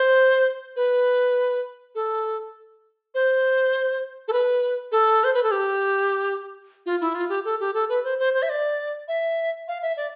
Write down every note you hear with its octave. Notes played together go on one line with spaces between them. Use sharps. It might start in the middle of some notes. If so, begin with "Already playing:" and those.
Already playing: C5
B4
A4
C5
A4
B4
A4
C5
B4
A4
G4
F4
E4
F4
G4
A4
G4
A4
B4
C5
C5
C5
E5
D5
E5
F5
E5
D5